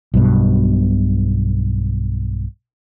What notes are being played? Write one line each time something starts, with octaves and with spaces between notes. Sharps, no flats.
B1 G2 B2